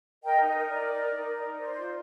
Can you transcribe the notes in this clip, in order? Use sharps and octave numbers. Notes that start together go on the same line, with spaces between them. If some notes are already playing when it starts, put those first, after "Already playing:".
A#4 D#5 G5
D#4
D#5
A#4
D5
D#4
A#4
D#4
A#4
D#4
C5 D5
F4